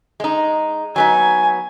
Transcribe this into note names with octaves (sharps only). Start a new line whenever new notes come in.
G#3 D#4
F#3 B3 D#4 G#5